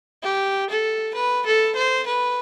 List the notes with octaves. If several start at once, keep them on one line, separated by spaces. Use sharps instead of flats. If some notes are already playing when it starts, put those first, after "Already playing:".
G4
A4
B4
A4
C5
B4